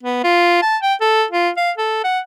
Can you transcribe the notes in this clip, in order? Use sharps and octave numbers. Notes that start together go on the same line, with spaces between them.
B3
F4
A5
G5
A4
F4
F5
A4
F#5